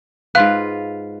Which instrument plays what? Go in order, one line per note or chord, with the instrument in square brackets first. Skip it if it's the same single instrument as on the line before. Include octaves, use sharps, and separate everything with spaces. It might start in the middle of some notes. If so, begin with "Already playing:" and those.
[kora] G#2 F4 B4 [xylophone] F5 F#6